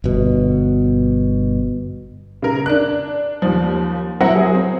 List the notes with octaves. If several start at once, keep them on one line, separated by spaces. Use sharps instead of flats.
G1 B2
C#3 A#4
D4 F#6
D#2 F3
F#3 C4 E4 A#4 F#5 A#6
F#3 G#4
C4